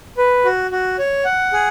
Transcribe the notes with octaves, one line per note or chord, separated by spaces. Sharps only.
B4
F#4
F#4
C#5
F#5
G#4